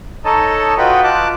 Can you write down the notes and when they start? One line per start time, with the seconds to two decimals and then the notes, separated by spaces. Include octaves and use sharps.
0.25 D#4 A4 C#5 D#5 A5
0.78 F4 F#4 B4 D#5 G5 B5
1.04 F4 A5 D6 F#6